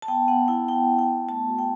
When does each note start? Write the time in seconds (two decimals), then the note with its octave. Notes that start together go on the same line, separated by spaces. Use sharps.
0.02 A5
0.08 B3 G5
0.28 B3 F#5
0.48 E4 G5
0.68 E4 G5
0.89 B3
0.98 G5
1.08 B3
1.28 A3 A5
1.48 F#4
1.58 G5